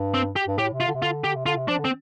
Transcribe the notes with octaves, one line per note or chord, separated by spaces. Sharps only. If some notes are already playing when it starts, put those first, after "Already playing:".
Already playing: G2
C4
G4
G2
A2 G4
C3
F4
D3
C3
D3 F4
G4
C3
D3 F4
C3
F3 D4
D3
C4